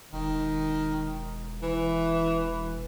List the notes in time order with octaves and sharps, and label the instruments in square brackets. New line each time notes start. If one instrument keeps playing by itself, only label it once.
[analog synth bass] E1 [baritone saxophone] D#3
[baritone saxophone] E3 [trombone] B4